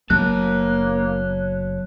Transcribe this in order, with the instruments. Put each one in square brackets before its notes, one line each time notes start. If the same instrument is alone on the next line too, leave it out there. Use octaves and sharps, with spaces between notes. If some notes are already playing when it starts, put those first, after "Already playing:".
[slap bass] F#1 F#3 B3 [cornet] A#3 [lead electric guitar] C#5 A5 [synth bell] F#6